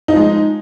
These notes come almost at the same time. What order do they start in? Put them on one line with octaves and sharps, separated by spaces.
D#4 F3 G#3